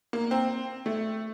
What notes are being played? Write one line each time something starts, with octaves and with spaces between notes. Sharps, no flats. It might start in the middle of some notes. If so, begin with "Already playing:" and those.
A#3
C4
A3